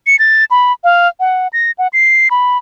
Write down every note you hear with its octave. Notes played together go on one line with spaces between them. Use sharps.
C#7
A6
B5
F5
F#5
A#6
F#5
C7
B5